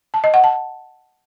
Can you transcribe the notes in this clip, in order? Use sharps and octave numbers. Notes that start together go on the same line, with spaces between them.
A5
D#5
F#5
A5